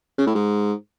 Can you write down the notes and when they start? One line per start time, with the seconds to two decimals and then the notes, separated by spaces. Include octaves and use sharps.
0.18 C#3
0.27 A2
0.35 G#2